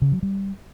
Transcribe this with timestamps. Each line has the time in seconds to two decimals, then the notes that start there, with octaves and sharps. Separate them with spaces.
0.02 C#3
0.12 F#3
0.23 G3